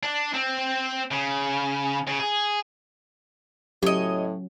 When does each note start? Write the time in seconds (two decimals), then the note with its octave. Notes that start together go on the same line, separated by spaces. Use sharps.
0.03 D4
0.34 C4
1.11 C#3
2.07 C#3
2.19 G#4
3.83 A2 F#3 C#4 G4 C#5 D#5 D7